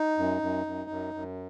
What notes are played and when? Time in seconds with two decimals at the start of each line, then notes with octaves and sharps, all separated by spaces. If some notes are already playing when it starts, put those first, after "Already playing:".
Already playing: D#4
0.18 F#2
0.42 F#2
0.66 F#2
0.90 F#2
1.14 F#2